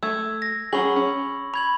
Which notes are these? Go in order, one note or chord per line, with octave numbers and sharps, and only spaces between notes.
A3 E6 G#6
A#6
F#3 C#4 G#4 B5 C#6 F#7
C#4
B5 G#6 F#7